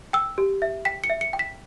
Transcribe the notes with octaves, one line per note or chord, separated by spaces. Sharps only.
G5 E6
G4
E5
G5 B6
C#7
E5
C#7
G5
B6